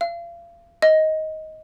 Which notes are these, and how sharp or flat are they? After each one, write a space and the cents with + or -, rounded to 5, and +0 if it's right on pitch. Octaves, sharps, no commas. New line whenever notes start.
F5 -35
D#5 +15